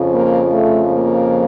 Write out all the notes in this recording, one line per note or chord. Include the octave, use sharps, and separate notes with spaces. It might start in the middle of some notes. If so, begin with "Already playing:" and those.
Already playing: F2 C#3 F3
A#3
A3
A#3